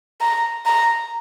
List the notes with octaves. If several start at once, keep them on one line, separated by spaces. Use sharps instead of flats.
A#5
A#5